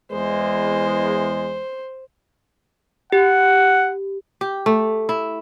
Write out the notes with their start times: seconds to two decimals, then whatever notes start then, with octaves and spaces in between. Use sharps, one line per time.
0.13 E2 G#3 C5
3.12 G4 F#5
4.41 G4
4.66 A3
5.09 E4